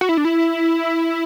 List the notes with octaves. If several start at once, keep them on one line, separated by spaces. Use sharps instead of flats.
F#4
E4
D4
E4